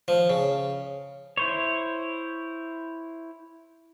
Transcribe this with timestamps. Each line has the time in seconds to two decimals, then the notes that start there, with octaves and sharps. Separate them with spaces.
0.08 F3
0.30 C#3
1.37 E4 C5 C#5